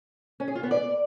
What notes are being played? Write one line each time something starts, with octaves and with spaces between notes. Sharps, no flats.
C#4
G#4
F4
B3
D5